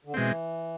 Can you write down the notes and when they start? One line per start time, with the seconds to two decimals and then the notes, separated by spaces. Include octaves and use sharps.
0.05 D3
0.14 B2 E3 G#3 C4